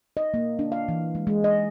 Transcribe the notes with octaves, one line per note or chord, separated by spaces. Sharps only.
D#5
A#3
D4
F5
E3
G#3
G#3
D#5